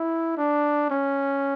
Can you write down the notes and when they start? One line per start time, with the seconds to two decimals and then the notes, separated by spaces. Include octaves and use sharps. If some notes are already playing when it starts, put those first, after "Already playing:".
Already playing: E4
0.38 D4
0.91 C#4